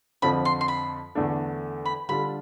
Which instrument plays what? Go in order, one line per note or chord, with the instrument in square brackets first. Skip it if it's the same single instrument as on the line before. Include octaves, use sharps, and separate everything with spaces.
[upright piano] F2 D3 F3 [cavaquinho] B5
[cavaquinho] C6
C6
B5
[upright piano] E2 D3 A3 D4 A4
[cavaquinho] B5
[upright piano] D3 G3 D4 F4 A4 [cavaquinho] B5